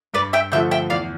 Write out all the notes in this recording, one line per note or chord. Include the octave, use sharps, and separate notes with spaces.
G2 B4 D5
E5 G5
D3 F3 A3 E5 G5
E5 G5
E2 D5 F5